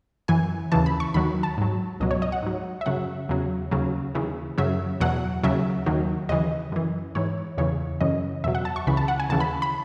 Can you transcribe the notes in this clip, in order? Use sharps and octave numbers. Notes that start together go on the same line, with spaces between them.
F#2 E3 G#5
D#2 C#3 E3 A5
B5
C#6
D#2 D#3 F#3 B5
A5
G#2 F#3
C#2 B2 F#3 D#5
C#5
D#5
F#5
G#2 F#3
E5
F#2 C#3 F#3 F#5
E2 C#3 F#3
D#2 C#3 F#3
D#2 C#3 E3
F#2 C#3 F#3 E5
E2 B2 F#3 F#5
D#2 C#3 F#3 E5
D#2 D#3 F#3
D#2 C#3 E3 D#5
F#2 E3
G#2 E3 C#5
E2 C#3 E3 C#5
F#2 C#3 E3 D#5
E2 B2 F#3 E5
F#5
A5
C#6
C#2 C#3 E3 B5
A5
F#5
G#5
D#2 C#3 E3 A5
B5
B5